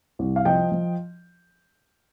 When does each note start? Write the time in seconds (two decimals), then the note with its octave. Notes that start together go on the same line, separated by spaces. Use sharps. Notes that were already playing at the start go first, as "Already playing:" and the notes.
0.19 C2
0.36 F5
0.45 F3 D#5 G5
0.72 F3